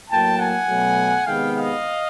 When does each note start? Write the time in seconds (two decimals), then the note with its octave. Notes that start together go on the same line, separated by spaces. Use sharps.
0.09 A2 F#3 A#3 G5 A5
0.38 F#5 G#5
0.68 B2 F#3 A3
1.26 C3 D#3 G#3 B3 F5 G5
1.54 D#5 F5